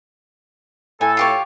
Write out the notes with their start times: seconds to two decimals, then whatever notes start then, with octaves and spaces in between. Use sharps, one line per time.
1.01 A2 A4 G#5
1.17 F4 G4 C#5